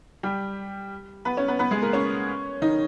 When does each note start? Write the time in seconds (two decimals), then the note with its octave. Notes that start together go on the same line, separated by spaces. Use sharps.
0.23 G3 G4
1.25 B3 B4
1.37 C#4 C#5
1.48 B3 B4
1.59 B3 B4
1.71 G#3 G#4
1.82 A#3 A#4
1.93 C#4 C#5
2.62 D#3 D#4